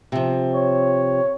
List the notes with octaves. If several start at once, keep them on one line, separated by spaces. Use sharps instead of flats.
C3 F3
C#5